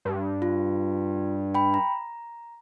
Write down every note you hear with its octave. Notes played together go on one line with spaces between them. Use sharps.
G2
F4
G5 B5
A#5